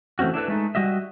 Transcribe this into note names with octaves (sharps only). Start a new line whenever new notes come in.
E3 A3 C4 C#4 F#4
D4 E4 A4 B4
G#3 A3 D#4
G3 F#4 D#5 E5